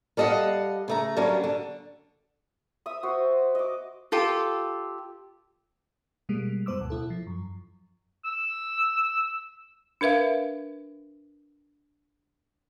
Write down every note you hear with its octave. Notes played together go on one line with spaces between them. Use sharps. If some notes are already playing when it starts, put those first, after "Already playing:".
G3 A4 D#5 F5 F#5
C#3 A3 A#5
D3 F#3 G3 A#3 C#4 C#5
D3
E5 D#6
F#4 C5
D#5 D6
F4 G4 A4
B2 G3 G#3 A#3
F#2 B3 C5 D6 E6
D2 B2
B2 E4 A4
F3
F#2
E6
D4 A#4 B4 E5 F5